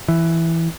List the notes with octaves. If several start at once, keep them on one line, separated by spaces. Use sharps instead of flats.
E3